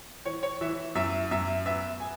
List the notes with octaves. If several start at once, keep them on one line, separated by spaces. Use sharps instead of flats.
E3 C#5
C#5
E3 E5
F#2 E5
F#2 E5
B3 E5
B3 G#5